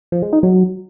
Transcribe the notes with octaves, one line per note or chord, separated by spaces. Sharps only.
F3
G#3
D#4
F#3